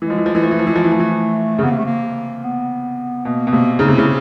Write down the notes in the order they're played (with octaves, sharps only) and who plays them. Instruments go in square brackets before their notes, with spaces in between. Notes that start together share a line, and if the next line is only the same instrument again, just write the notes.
[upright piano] E3 [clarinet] G#3
[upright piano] F3
E3
F3
[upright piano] E3 [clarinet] G#3
[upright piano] F3 [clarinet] A3
[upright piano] E3
F3
E3
[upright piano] F3 [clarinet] G#3
[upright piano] E3 [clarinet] A3
[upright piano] F3
E3
C#3
[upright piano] C3 [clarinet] B3
[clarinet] A#3
A3
A#3
B3
[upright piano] B2 [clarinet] A#3
[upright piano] B2
[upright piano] C3 [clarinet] A#3
[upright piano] C#3 [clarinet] D#4
[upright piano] C3
[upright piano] C#3 [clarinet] E4